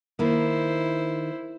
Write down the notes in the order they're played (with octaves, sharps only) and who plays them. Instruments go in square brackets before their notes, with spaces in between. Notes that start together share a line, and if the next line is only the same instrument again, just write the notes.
[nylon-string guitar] D#3 A#3 [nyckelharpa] E4 C5